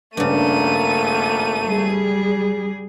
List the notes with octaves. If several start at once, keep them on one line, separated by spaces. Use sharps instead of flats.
G#1 G2 C#3 A3 A#3 D#7
G3 G#4